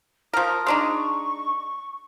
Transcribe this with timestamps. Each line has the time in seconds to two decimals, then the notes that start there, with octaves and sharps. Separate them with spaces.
0.33 F3 A#4 D#6
0.67 G#3 D4 D#4 C#6